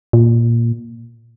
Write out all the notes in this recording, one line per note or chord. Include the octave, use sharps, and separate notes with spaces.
A#2